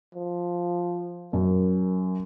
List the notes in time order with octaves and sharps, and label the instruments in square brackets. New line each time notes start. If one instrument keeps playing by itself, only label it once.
[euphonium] F3
[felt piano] F#2 [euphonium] A#4